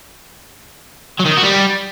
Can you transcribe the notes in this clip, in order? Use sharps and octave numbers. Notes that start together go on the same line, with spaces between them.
F#3
D#3
D#4
F#4
G3